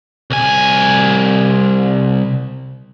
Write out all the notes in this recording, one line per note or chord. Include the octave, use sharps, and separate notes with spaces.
C2 G#5